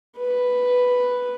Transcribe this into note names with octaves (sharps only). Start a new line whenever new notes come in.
B4